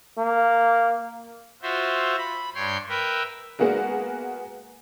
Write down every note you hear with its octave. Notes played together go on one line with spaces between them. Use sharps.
A#3
F4 F#4 C5 E5
B5
G2 C#5 G5 C6
A#4 B4 E5 G5
G#3 A#3 B3 F#4 G#4 A#4